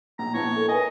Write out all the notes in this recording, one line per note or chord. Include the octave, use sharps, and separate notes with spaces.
A#1 A#5
A#1 B3 E4 C#5 A5
A4 A#4 A#5
A#4 B4 D#5 G#5